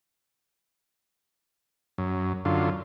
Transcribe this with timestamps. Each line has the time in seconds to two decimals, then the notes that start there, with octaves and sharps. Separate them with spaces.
1.98 F#2
2.45 F#2 D3 F4